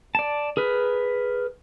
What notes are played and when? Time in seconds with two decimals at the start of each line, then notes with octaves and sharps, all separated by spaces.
0.15 D5 A5
0.57 G#4 A#4 B4